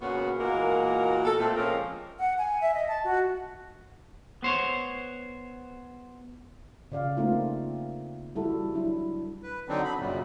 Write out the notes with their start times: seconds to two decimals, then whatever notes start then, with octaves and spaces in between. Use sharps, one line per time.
0.01 A#2 C#3 A#3 B3 C#4 F#4
0.38 E2 A#2 G#3 A#3 F#4 A#4
1.25 A4
1.39 A#2 A3 C4
1.57 F3 G#3 A#3 C4 C#4 A#4
2.19 F#5
2.38 G#5
2.61 E5
2.74 D#5
2.88 A5
3.04 F#4
4.42 B3 C5 C#5
6.92 C#3 D5 F5
7.17 A3 A#3 C4 D#4 F4
8.36 G3 E4 F#4 A4
8.74 F#3 D4 E4
9.43 B4
9.68 D3 F#3 C4 D4 D#4
9.84 B5
9.99 F#2 A#2 C#3 F#3 G3